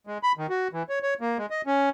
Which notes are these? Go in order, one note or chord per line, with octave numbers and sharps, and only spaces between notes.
G#3
B5
D#3
F#4
E3
C#5
C#5
A#3
G#3
D#5
C#4